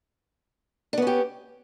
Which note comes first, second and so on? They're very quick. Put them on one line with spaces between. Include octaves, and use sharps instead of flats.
D4 B3 C#4 G4